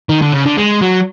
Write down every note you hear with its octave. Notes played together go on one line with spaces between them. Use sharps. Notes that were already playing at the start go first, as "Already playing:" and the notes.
D#3
D3
C#3
D3
G#3
F#3